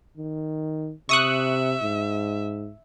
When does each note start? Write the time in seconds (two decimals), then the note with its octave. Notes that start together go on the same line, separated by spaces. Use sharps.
0.17 D#3
1.09 C3 E5 C#6 D#6 F#6
1.82 G#2